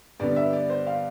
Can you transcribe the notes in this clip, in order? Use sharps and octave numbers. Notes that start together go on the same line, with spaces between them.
G2 D3 G3 B3 D5
E5
D5
C5
F5